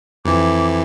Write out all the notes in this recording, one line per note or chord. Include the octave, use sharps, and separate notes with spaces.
F2 E3 D6